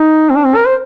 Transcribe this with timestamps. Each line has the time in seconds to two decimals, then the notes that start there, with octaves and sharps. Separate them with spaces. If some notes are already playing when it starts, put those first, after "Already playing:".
Already playing: D#4
0.30 C4
0.36 D4
0.46 C4
0.56 A#4
0.66 C5